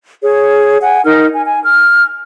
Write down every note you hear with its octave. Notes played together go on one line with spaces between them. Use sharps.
G#4 C#5
F#5 G#5
D#4 A#4 F6
G#5
G#5
F6